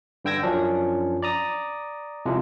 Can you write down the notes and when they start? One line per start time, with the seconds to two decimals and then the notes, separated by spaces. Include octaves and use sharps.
0.25 G2 D3 G5 E6 G#6 A#6
0.43 F#2 F3 C#4 D4
1.22 D5 A#5 D#6
2.26 C2 C3 F3 G#3